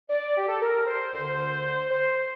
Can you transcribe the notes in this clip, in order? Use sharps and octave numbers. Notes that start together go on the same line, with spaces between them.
D5
G4
A4
A#4
C5
D2 D3 C5
C5